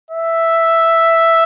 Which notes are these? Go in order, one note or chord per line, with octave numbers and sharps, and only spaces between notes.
E5